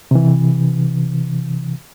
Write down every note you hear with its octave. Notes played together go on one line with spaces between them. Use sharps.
C3 E3